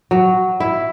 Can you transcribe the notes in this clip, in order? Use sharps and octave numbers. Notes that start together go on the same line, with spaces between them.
F#3
E4